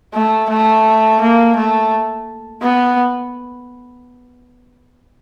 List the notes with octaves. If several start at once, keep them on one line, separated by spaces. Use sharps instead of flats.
A3
A3
A#3
A3
B3